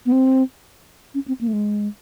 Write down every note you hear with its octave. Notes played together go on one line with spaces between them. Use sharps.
B3
C4
C#4
C4
A#3
A3
G#3